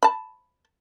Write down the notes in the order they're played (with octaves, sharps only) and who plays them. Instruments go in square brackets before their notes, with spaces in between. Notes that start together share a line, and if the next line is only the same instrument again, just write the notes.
[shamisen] A5 B5